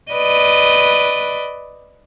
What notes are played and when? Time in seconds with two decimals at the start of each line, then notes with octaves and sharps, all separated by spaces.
0.12 B4 D5 D#5